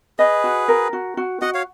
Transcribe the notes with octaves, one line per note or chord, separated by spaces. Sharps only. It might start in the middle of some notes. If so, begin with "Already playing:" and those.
G#4 B4 D#5
F#4
A#4
F#4
F#4
F#4 D#5 F#5
C#5 F5